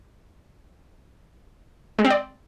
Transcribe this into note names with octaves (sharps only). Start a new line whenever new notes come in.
G#3
C4
D5